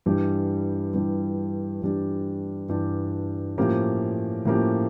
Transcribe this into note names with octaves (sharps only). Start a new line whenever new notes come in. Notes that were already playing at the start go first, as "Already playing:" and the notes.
G2 E3 G3 D4 G4
G2 E3 G3 D4 G4
G2 E3 G3 D4 G4
G2 E3 G3 D4 G4
A2 F3 A#3 C#4 G4
A2 F3 A#3 C#4 G4